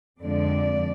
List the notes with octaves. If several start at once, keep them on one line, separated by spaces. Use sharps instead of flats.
F2 D3 F3 G#3 D5